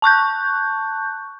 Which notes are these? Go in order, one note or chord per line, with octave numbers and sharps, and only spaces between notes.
A5 C#6 F#6 G6